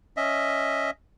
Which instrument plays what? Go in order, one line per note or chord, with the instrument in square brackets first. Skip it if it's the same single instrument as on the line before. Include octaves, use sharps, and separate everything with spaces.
[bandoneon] C#4 D#5 E5